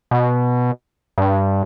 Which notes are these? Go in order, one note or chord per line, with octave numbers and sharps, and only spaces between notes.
B2
G2